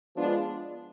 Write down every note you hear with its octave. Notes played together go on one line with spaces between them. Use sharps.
F3 G#3 B3 D4 F4